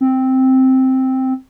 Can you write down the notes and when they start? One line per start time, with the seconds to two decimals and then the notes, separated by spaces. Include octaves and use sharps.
0.01 C4